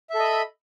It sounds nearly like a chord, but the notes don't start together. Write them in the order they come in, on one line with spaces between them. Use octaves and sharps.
E5 A4 D#5 B5